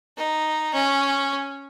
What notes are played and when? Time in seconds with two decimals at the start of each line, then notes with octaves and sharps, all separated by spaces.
0.17 D#4
0.74 C#4